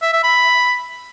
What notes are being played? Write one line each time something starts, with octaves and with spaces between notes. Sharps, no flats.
E5
E5
B5